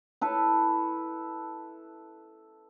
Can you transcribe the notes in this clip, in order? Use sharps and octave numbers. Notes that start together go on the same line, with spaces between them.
E4 A4 B4